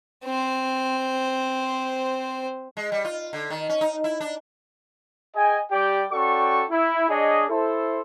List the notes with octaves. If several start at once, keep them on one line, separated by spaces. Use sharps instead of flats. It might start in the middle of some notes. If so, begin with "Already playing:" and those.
C4 C5
G#3
G3
F4
D3
D#3
C#4
D#4
E4
D4
G#4 D#5 G5 G#5
G3 G4 D5 G5
C#4 F#4 A4 D5 G5 C#6
E4
D4 G#4 C#5 D#5
E4 A4 C5